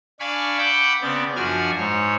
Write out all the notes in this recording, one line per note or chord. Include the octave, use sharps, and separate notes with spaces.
D4 D5 F5 G#5 B5 C#6
F#5 G5 B5 D6 E6 G6
C#3 B3 C4 D5
F#2 F3 D4 F#4 G#5 F6
G#2 C#5